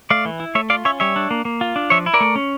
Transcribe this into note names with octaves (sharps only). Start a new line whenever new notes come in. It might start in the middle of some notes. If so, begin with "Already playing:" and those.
A3 D5 F5
E3
E4
A3 C#5 E5
F4 D5 F5
C#4 C#5 E5
G3 C#5 E5
D4
A#3
A#3
F4
D4
F3 C#5 E5
E4
A#4 D5
A3
C#4